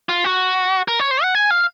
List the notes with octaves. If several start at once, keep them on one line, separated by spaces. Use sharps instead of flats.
F4
F#4
A#4
C#5
C5
F#5
G#5
F5